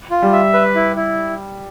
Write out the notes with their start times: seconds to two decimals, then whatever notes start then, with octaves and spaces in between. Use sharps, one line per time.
0.11 F4
0.22 G3
0.33 E5
0.53 B4
0.75 E4
0.96 E4